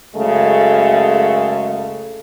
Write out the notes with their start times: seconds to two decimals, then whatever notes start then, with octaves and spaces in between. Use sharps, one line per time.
0.15 F#2 C#3 G#3 A3 A4